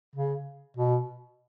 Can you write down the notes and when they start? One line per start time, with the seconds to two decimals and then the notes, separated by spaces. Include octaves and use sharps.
0.16 C#3
0.77 B2